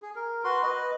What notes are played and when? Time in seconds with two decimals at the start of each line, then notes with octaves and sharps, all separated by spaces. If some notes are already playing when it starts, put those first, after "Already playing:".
0.02 G#4
0.16 A#4
0.44 F#4 B4 C6
0.63 B4 D#5